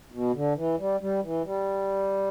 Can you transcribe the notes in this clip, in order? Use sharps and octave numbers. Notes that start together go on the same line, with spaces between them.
B2
D3
E3
G3
G3
E3
G3